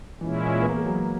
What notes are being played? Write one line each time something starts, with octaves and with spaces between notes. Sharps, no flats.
A#2 E3 G#3 C#4 E4
B3
A#3
G#3
F#3